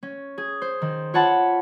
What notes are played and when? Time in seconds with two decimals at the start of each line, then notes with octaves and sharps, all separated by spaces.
0.03 C#4
0.38 G#4
0.62 C5
0.82 D#3
1.14 F4 C#5 F#5 A5 B5